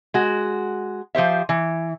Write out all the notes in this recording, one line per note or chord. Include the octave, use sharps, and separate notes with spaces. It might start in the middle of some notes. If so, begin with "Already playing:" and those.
G#3 F#4
F3 G4 C5 E5
E3